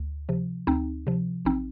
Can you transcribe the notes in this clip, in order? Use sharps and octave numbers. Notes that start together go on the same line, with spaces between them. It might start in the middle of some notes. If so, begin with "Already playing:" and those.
Already playing: D2
C3 F3
D2 C4 D#4
C3 F3
A1 C4 D#4